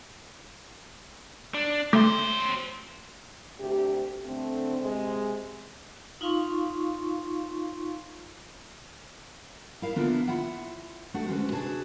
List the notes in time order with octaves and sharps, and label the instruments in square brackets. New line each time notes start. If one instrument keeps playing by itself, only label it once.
[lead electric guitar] D4
[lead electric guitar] F#3 C5 [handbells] A3
[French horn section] D2 C3 G4
D3 A3 C4
C3 G#3
[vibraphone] D#4 F4 F5 C6 C#6
[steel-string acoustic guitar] E4 A#4 F5
D3 A#3 B3 D4 E4 F4
E4 F4 E5 F#5
A3 D4 F#4 A4 F#5
D2 G#3 B3 C#4 F#4 B4
C3 D4 F#4 G#4 B4 A5